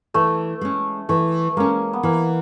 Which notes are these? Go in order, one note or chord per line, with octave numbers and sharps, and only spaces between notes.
E3 A3
G#3 C#4
E3 A3
G#3 A#3 C#4
B3
E3 A#3